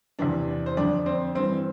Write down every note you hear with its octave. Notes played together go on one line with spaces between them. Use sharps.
E2 C3 E3 D4 D5
C5
F2 D3 D4 D5
C4 C5
G2 E3 C4 C5